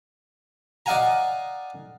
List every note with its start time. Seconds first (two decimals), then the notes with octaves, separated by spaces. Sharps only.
0.86 D5 D#5 F5 F#5 G#5 A#5